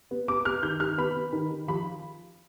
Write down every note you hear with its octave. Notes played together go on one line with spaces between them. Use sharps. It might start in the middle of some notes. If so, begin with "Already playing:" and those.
B3
B3 D6
B3 F6
D#3 G6
D#3 F6
B3 B5
B3
D#3
D#3
F3 B5